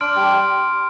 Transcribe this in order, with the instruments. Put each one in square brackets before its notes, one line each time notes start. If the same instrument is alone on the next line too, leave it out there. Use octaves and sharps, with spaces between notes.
[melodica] D4 [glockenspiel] C6 F6 D7
[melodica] G3 G4